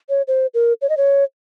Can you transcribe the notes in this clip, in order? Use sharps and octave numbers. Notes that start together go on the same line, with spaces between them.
C#5
C5
A#4
C#5
D#5
C#5